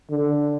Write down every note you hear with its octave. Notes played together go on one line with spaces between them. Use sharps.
D3